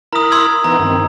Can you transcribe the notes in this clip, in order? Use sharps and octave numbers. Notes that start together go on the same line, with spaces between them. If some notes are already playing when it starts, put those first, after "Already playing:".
E4 A#4 A#5 B5 D#6
C6 E6 G#6
E3 B3 D#4 A#5
G2 D#3 C4